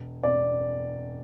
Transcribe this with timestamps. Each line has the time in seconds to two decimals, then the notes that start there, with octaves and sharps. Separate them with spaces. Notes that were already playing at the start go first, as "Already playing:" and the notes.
Already playing: E1
0.23 E1 D5